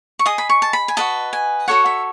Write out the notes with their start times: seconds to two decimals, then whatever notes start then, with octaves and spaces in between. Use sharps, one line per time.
0.19 C#6
0.26 G#4 D#5 D#6
0.38 B5
0.49 C#6
0.62 A5
0.73 B5
0.88 G#5
0.97 F#4 B4 D#5 A5
1.33 G#5
1.68 F#4 A4 C#5 F#5
1.86 E5